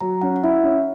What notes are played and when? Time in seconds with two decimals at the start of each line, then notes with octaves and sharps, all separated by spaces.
0.01 F#3 A#5
0.21 C#4 F#5
0.36 F#5
0.43 E4 E5
0.63 C#4